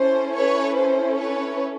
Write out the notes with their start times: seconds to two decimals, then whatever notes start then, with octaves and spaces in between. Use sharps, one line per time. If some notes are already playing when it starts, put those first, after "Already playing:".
Already playing: C#4 E4 A4 C5
0.35 B4 C#5
0.76 C5
1.17 B4 C#5